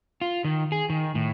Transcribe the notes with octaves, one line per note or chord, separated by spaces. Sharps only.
F4
D#3
G#4
D#3
A2